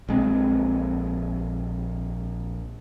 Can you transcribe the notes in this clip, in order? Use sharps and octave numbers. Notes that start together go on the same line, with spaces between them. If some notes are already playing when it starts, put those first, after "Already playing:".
A#1 G#3 C4